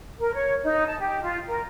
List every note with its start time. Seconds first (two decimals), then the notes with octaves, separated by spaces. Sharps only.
0.20 A#4
0.34 C#5
0.64 D#4
0.87 A5
1.00 G4
1.22 F4
1.47 A#4